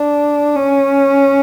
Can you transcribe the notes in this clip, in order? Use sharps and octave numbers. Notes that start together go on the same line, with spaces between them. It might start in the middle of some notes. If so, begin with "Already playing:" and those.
Already playing: D4
C#4